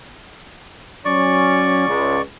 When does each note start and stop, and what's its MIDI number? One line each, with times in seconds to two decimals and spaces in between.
1.05 1.87 54
1.05 1.87 61
1.05 2.22 74
1.05 2.22 85
1.87 2.18 37